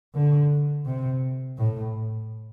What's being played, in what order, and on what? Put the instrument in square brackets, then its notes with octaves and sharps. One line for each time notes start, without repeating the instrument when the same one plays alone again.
[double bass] D3
C3
A2